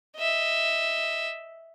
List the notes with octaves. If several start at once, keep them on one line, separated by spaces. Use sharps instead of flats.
D#5 E5